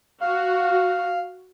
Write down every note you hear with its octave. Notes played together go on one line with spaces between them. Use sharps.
F#4 F5